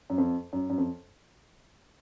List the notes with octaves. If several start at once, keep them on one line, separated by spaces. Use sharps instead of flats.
F#2
F2
F#2
F#2
F2